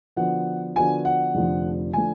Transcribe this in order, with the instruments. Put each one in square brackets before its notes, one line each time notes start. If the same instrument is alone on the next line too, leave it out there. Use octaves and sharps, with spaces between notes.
[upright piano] D3 F3 B3 F#4 [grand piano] F#5
[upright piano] D3 F3 B3 F#4 [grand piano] G#5
[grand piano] F#5
[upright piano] F1 F2 D3 F3 A3
[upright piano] D3 F3 A3 [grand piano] G#5